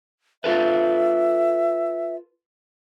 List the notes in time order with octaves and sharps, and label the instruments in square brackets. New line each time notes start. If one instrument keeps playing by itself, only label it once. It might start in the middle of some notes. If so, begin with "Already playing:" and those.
[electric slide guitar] F4 A4 B4 [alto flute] E5